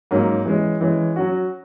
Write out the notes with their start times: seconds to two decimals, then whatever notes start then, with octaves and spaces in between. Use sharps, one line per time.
0.11 G#2 F#3 A#3 C#4
0.45 E3 G#3 C#4
0.81 E3 G#3 C#4
1.16 F#3 C#4 F#4